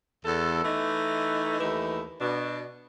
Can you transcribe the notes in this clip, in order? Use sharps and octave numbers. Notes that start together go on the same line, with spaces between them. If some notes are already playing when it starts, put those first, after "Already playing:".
E2 A4
E3 A3 D#4
D#2 E3 A3 D#4
B2 D4